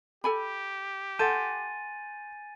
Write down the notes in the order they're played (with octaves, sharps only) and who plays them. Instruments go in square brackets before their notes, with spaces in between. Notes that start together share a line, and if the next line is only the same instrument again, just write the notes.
[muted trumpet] G4 [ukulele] A4 G#5 B5
[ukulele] A4 A5 [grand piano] F#5 C6 G6 [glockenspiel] G#5 A6 D#7